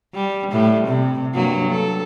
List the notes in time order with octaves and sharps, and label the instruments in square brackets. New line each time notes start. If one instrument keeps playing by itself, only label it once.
[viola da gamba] G3
A2 G3
C3
G2 F#3 A#3
A4